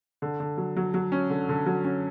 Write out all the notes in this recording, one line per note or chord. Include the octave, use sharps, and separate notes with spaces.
D3
D3
F#3
F#3
F#3
C#4
D3
D3
F#3
C#4